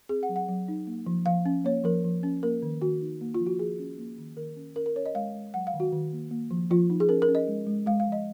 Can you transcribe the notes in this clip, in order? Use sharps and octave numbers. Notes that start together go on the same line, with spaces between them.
C4 G#4
F#5
F#3
F#5
F#3
D#4
A#3
F3
F3 F5
C#4
A#3 C#5
F3 A#4
F3
C#4
A#3 A#4
D#3
D#3 F#4
D#4
A#3
F3 F4
F#4
F3 G#4
C#4
A#3
D#3
D#3 A#4
C#4
C#4 A#4
A#4
C#4 C#5
D#5
G#3 F5
G#3
F#3 F#5
F5
D#3
F#4
D#3
A#3
A#3
F3
F3 F4
D#4
G#4
C#4 A#4
A#4
C#4
D#5
G#3
G#3
G#3 F5
F5
F3
D#5